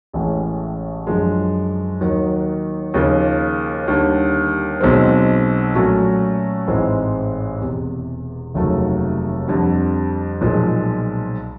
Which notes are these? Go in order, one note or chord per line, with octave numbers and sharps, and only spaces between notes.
A1 A2 E3 G#3 C#4
F#2 D3 F3 G#3
D#2 D#3 F#3
D#2 C#3 F3
D#2 D3 G3
B1 B2 G#3 C4
A#2 F#3 A3 C#4 F#4
A1 G#2 E3 G#3 C4
E1 E2 C3
F1 D#2 C#3 F#3 A3
F2 D3 G3
B1 A#2 F3 G#3